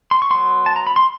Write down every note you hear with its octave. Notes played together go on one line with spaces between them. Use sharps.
C6
C#6
F#3 B3 C6
A5
A#5
B5
C6